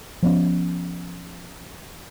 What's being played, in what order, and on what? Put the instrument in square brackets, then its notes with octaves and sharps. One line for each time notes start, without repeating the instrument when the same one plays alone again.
[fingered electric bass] F3 B3 C#4